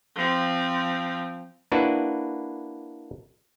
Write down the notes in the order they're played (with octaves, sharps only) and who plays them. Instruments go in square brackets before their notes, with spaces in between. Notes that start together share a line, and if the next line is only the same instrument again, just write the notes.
[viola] F3 C4
[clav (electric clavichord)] A#3 D4 E4 F#4 B4 D5